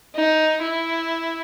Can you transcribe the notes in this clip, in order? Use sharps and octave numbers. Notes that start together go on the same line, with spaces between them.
D#4
E4